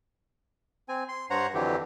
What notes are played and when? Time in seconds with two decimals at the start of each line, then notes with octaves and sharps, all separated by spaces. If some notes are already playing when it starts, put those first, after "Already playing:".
0.89 C4 G#5
1.08 C6
1.30 G2 C5 C#5 F#5 A#5
1.54 F2 D3 E3 F#3 G4